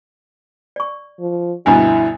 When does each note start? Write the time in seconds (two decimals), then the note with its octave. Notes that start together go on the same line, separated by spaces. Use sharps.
0.76 D5 C#6
1.20 F3
1.66 D2 G2 B2 E4 G#5 A#5